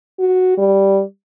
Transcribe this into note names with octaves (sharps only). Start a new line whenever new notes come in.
F#4
G3